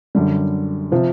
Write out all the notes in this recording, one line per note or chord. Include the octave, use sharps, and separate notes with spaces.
F#2 D3 G3
C3 F3